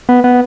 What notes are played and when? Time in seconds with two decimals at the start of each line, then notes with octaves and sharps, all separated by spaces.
0.09 B3
0.24 B3